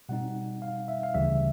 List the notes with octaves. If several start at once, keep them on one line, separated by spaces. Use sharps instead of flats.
B2 G3 C4 D#4 F#5
F5
E5
F5
D2 C#3 E3 G3 E5